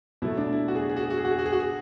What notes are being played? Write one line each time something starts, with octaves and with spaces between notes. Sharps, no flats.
B2 F#3 A3 E4
D4
E4
F#4
G#4
F#4
G#4
F#4
G#4
F#4
G#4
F#4
G#4
F#4
G#4
F#4
G#4